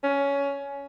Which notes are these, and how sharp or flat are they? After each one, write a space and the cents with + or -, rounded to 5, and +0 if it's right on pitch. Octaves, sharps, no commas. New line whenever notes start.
C#4 +15